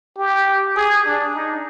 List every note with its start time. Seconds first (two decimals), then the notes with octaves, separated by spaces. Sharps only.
0.17 G4
0.76 G#4
1.06 D4
1.35 D#4